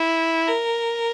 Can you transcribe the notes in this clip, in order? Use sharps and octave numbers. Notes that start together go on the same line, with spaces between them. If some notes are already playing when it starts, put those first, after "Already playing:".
Already playing: E4
A#4